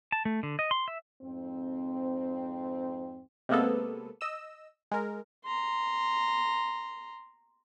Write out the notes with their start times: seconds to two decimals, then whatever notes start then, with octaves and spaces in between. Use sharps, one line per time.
0.12 A5
0.25 A3
0.43 D3
0.59 D#5
0.71 C6
0.88 E5
1.22 F2 G#2 C4
3.49 C3 G#3 A#3 B3 A4
4.21 D#5 E6 E7
4.91 G#3 A#4
5.45 A#5 C6